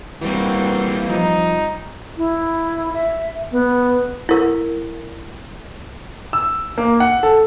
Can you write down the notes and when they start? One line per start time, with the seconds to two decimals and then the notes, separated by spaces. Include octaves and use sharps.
0.22 E3 G3 A#3 C4 F#4
1.09 F3 D#4
2.17 E4
2.93 E5
3.51 B3
4.29 E4 A#4
6.33 E6
6.78 A#3
7.00 F#5
7.23 A4